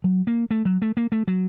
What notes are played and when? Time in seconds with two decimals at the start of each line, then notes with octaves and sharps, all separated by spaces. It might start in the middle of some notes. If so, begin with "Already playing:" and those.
0.04 F#3
0.27 A#3
0.51 A3
0.65 F#3
0.82 A3
0.97 A#3
1.12 A3
1.28 F#3